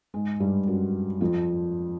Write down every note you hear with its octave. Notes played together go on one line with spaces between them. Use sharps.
G#2 G#3
G2 G3
F#2 F#3
F2 F3